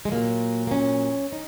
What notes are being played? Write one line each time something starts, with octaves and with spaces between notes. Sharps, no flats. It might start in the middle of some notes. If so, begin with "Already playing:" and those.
G#3
A#2 F#3 A#3
A#3
C#4
D#4